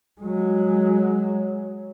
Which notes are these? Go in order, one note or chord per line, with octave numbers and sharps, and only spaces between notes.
F#3 G#3